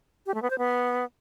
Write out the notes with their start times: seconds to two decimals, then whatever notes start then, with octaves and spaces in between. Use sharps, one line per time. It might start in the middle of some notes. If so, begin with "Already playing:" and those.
0.26 G4
0.34 A3
0.42 B3
0.50 C5
0.58 B3